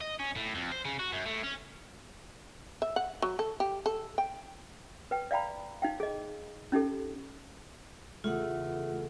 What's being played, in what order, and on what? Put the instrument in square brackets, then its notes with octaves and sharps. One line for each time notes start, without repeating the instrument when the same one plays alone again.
[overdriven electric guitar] D#5
C#4
A2
F2
C5
C#3
F#4
F#2
A2
C#4
[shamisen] E5
F#5
F#3
A4
G4
A4
G5
[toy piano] B4 G5
D5 F5 G5 A#5 B5
D#4 F5 G5
G#4 D#5
C#4 D#4 G4 A4
[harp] E2 C#3 B3 [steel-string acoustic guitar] A3 [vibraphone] F4 F#5